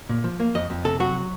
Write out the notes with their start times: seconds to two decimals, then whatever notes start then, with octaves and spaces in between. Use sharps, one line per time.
0.09 A#2
0.24 F3
0.40 A#3
0.55 F2 D#5
0.70 F2
0.85 C3 A4
1.00 F#3 F#4